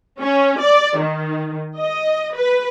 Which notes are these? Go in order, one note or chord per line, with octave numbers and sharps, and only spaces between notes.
C#4
D5
D#3
D#5
B4